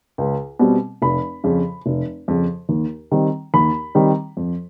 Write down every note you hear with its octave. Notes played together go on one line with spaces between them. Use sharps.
C#2
B2 G3 C4
F1 B5
F2 C#3
F1
F2 C#3
D#2
D#3 G3 C4
D#2 B5
D#3 G3 C4
F2